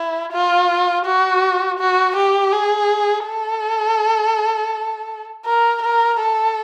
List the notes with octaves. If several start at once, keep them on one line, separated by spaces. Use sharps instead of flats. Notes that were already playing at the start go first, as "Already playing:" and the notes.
Already playing: E4
F4
F#4
F#4
G4
G#4
A4
A#4
A#4
A4